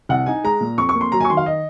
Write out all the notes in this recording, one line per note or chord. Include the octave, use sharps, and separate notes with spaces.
C2 F#5
D#4 G#5
G#3 A#5
A#2
F2 C#6
C#6
A#3
C6
F#3 A#5
G#5
C#6
D#3 C6
F5
D#5